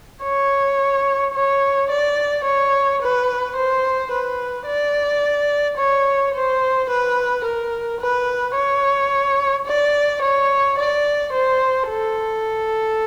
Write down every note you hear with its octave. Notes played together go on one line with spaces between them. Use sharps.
C#5
C#5
D5
C#5
B4
C5
B4
D5
C#5
C5
B4
A#4
B4
C#5
D5
C#5
D5
C5
A4